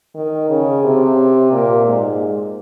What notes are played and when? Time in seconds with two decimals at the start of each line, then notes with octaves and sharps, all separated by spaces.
0.15 D#3
0.49 C#3
0.84 C3
1.52 A#2
1.86 G#2